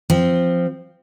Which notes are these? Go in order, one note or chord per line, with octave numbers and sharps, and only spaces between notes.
F3 C4